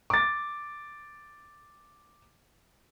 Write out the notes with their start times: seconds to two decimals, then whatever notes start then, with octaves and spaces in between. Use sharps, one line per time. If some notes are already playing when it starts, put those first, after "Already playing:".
0.10 D6 A6